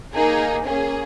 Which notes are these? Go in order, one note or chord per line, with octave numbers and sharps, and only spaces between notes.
A#3 D#4 G#4
A#3 C#4 G#4